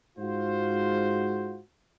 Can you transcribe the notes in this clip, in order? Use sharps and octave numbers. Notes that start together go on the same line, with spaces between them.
G#2 F4 F#4 C5